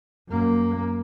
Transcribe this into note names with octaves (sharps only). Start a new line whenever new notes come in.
F#2 A#3